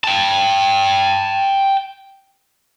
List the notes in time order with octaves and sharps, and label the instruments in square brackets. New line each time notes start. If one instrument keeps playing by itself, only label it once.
[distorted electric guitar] G5 A5